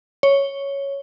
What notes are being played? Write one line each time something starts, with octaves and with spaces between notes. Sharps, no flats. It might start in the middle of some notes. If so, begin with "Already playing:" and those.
C#5